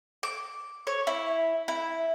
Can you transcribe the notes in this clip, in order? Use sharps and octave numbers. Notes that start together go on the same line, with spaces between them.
D6
C#5
E4
E4